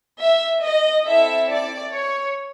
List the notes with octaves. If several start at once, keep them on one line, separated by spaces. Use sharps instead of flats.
E5
D#5
C4 E4 A4 E5
D5
C#5